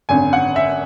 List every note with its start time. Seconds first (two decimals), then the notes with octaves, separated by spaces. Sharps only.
0.09 G#1 F#2 D3 G#5
0.33 F#5
0.56 E5